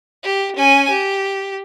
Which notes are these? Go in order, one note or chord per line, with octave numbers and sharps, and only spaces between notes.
G4
C#4 G#5
G4